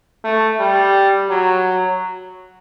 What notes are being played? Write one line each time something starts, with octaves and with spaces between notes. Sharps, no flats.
A3
G3
F#3